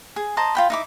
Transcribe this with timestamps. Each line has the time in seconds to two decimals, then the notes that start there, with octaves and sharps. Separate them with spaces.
0.16 G#4
0.37 C5 D#5 A5 A#5
0.55 F4 G5 B5
0.70 D#4 E4 D6